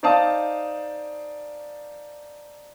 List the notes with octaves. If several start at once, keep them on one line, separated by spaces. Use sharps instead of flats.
D#4 C5 D5 F5 A5 D#6